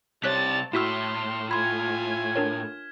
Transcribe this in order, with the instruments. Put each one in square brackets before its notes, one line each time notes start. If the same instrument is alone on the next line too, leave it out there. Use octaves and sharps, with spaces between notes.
[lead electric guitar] C3 G3 [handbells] C#5 F#6 B6 [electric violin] A5 A6
[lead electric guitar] A2 [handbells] E4 F#4 E6 [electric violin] C6 [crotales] F6 B6 E7
[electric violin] F4 G#5 [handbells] B5 C6 [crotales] G#6
[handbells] D4 A#4 C#5